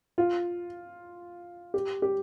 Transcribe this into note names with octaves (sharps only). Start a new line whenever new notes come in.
F4
G4
G4